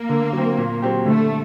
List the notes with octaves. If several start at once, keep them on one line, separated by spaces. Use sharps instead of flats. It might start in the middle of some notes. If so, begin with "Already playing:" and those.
Already playing: A#3
D3
F#3 C4
A#2
F#3 C4 G4
D3 A3